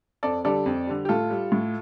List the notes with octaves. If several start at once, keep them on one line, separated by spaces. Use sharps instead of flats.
F2 A4 D5
D3 G3 A4 D5
F2
D3 G3
G4
A2 F4 A4
G3
A2